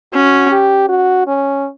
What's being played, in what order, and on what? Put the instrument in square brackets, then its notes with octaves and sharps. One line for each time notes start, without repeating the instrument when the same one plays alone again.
[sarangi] C#4 [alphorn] F#4
[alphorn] G4
F#4
C#4